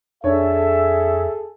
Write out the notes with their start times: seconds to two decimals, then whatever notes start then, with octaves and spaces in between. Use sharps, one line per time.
0.24 F2 D4 G#4 A4 C#5 E5